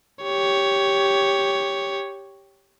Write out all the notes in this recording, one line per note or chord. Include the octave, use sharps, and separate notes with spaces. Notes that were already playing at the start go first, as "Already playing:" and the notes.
G4 C#5